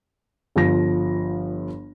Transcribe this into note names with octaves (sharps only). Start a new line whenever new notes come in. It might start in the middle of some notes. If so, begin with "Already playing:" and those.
G1 F3 A#6